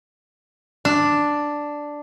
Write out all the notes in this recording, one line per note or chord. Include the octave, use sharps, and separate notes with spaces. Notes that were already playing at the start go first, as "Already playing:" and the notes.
D4